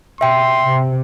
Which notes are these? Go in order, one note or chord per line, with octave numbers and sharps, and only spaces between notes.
B2 E5 G5 C6
C3